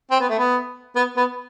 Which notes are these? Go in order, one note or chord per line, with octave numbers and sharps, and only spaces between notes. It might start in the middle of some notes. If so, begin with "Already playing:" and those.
C4
B3
A3
B3
B3
B3